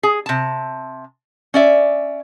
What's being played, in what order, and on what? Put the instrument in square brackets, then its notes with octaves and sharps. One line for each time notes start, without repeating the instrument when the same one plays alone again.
[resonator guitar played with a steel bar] G#4
C3 A5
C#4 D5 E5